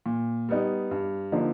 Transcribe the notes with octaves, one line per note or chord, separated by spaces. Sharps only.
A#2
G3 B3 D#4
G2
D3 F3 A#3 D#4